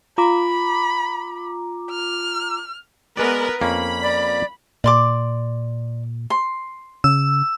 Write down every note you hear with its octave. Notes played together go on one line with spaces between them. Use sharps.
F4 A#5 B5 D6
F6
G#3 B3 A#4 B4 D5
F2 A#3 C#4 B5
D5
A#2 D5 C6 D6
C6
C#3 E6